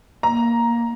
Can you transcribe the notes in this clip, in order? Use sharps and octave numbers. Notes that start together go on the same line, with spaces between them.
A#3 A#5